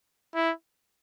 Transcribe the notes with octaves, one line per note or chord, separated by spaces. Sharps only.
E4